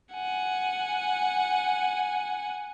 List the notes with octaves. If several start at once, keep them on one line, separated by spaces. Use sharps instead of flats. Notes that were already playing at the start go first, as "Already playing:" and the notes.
F#5 G#5